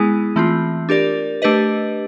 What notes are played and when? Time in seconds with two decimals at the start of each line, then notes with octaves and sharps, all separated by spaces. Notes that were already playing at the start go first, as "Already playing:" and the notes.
Already playing: G#3 B3 E4 G#4
0.36 E3 A3 C4 F4
0.89 D4 G4 A#4 D5
1.42 A3 D4 G4 B4 D#5